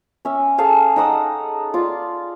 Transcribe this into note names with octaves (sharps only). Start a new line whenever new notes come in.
C#4 E5
G#4 A4 F5 A5
D#4 F#5 D#6 E6
F4 D5